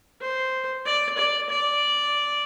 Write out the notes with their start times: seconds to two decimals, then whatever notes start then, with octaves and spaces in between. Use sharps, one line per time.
0.21 C5
0.86 D5
1.18 D5
1.50 D5